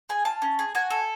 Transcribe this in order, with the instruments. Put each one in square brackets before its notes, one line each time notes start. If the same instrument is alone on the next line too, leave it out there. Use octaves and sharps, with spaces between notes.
[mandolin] G#4 G#5
F4 A5
C#4
G#4
F#4 G#5
A4